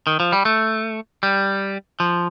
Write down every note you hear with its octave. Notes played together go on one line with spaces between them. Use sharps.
D#3
F3
G3
A3
G3
F3